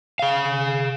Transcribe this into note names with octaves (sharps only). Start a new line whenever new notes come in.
G#4 F5